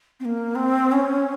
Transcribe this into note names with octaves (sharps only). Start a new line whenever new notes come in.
C4
A#3
C4
C#4